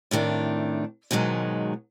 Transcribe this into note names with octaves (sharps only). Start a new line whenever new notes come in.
A2 C3 D#3 D4
G#2 B2 D#3 F#3 G#3